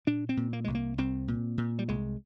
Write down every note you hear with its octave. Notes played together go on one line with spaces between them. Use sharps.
A#2 D4
C4
A#2
A#3
C2 G#3
A#3
C2 C4
A#2
A#2
G3
C2 G#3